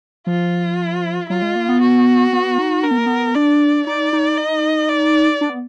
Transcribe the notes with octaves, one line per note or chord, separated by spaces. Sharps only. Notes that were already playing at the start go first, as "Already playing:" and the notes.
F3 F4
F#3 F4
G#3
A#3
B3
F#4
B3
D#4
D4 A#4
B3
A#3
B3
D4 D5
D#4 D5
D#4
D#5
D5
D4
B3